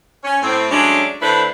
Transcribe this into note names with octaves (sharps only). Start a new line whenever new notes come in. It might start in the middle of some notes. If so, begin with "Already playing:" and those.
C#4
A2 C4
F#3 G#3 A3 C#4 D4
D3 A3 D4 E4 B4 C5